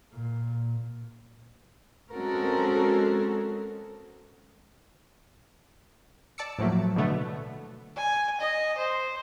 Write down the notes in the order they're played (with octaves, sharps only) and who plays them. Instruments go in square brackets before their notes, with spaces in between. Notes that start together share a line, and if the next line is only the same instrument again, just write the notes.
[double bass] A#2
[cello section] G#3 C4 C#4 F#4 A4 A#4
[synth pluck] D5 A5 D6 E6 C#7
A2 F3 F#3 A3 A#3
B2 D3 A3 B3
[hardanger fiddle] G#5
D#5
C5